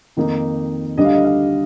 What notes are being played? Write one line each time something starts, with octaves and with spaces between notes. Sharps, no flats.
F2 D#3 A#3 D#4
D2 D3 G3 D4 D#5
F5
D#5
F5